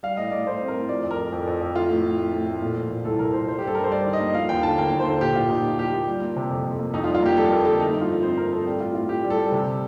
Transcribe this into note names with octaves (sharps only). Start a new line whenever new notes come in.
G3 F5
A2 D#5
A2 D5
A2 C5
C4
A#4
A2
F3 D5
F2
A#4
F3
F2
F2
F2
A3 F4
A2
A2
A3
A2
A3
A#2
F3
A#2
C2 A4
C2 A#4
F3 C5
G3 C5
G4
G2 A4
G2 A#4
C5
G3 D5
D#3
D#5
A#3
F3 F5
D#2 G5
D3 A5
A#3 G5
D#2
C5
D3
A#2 G4
A#2 F4
A#2 D#4
A#3
F3 G4
A#3 F4
G3
A#3
C3
F2
F2
A#3
F2 D#4
F4
G3
F4
A#3 G4
G3 A4
A#3 A#4
D3 A4
A3 D#4
G2
F4
F3
C4 C5
C4 A#4
C4 A4
G3 G4
A2 F4
A2 F4
A2 G4
G3
A4
G3
C3